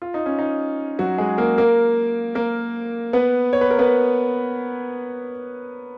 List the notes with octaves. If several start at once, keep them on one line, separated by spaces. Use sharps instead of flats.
F4
D#4
C#4
D#4
F#3 F#4
G#3 G#4
A#3 A#4
A#3 A#4
A#3 A#4
B3 B4
C#5
B4
A#4
B3 B4